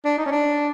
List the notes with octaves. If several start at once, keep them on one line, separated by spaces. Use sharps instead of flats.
D4
D#4
C#4
D4